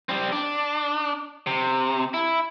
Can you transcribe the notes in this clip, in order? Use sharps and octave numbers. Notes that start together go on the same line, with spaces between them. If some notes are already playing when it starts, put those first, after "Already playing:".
G3 C4
D4
C3
E4